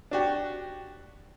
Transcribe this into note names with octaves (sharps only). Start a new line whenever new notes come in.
D4 F#4 G4